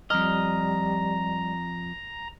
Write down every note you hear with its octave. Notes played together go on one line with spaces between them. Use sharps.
F2 G3 D#5 A#5 F6